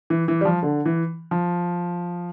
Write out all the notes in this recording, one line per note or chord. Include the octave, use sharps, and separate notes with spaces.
E3
E3
G3
F3
D3
E3
F3